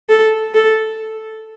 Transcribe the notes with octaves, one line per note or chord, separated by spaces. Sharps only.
A4
A4